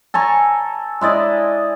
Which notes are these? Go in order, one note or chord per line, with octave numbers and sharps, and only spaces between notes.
A4 G#5 A#5 C#6
G#3 E4 D5 D#5